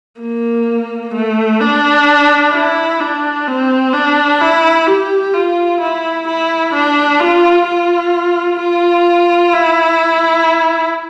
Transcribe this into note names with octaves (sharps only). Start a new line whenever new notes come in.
A#3
A3
D4
E4
D4
C4
D4
E4
G4
F4
E4
E4
D4
F4
F4
F4
E4